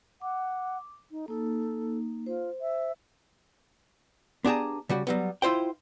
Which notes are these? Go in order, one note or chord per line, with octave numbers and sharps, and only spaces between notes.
F#5 D6
D#4
A#3 D#4 A4
F4 C5
E5
B3 D4 G4 G#4 A5 A#5
C#3 G3 F#4
F#3 G3 B3
E4 F4 C5 G5